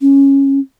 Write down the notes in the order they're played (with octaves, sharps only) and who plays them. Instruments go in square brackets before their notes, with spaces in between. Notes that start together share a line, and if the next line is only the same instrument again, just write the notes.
[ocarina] C#4